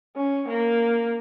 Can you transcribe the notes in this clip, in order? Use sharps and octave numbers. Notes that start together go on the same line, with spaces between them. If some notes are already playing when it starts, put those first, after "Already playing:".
C#4
A#3